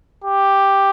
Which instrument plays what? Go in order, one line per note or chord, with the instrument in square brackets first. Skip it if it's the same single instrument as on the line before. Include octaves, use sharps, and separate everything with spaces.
[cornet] G4